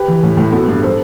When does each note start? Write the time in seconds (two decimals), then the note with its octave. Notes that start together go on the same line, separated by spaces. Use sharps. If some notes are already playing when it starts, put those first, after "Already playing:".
Already playing: G4 B4
0.08 E3
0.23 A2
0.37 A2
0.52 B3 F#4 A4
0.68 G2
0.83 A4 C5